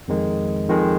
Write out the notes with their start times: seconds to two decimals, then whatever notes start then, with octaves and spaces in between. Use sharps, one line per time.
0.08 F2 D#3 G#3
0.69 F2 D#3 G#3